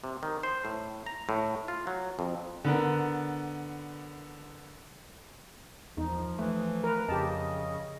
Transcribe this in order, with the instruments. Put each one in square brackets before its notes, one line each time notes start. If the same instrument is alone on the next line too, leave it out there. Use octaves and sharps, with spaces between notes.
[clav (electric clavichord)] C3
D#3
C5
A2
A#5
A2
F4
F#3
F2
[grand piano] D3 B3 A#4
[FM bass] E2 [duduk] F3 [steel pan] D#4
[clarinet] E3 [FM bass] A3
[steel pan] A#4 B4
[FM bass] F2 [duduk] C#3 [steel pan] G4 A5 [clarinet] D#5